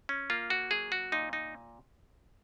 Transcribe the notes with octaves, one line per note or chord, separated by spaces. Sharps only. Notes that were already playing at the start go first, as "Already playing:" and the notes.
C#4
A#3 F4
F#4
F#3 G#4
F#4
A#2 D#4
D#4